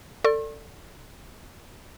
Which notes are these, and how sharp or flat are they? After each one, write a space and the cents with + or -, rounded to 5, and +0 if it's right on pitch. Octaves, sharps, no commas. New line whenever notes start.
A4 +25 D5 +0 C#6 -45